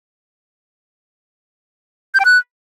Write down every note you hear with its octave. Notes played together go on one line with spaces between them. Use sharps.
G6
G5
F#6